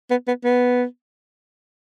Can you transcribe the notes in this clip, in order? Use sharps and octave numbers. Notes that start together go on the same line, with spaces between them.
B3
B3
B3